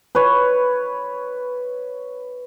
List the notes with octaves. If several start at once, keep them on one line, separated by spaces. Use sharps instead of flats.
B4 C#5